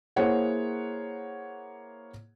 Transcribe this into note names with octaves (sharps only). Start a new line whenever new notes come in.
A#3 E4 G#4 C5 C#5 F#5